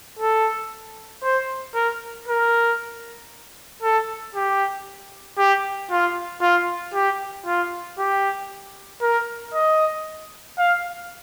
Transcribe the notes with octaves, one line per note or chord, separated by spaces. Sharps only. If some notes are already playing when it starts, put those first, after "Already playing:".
A4
C5
A#4
A#4
A4
G4
G4
F4
F4
G4
F4
G4
A#4
D#5
F5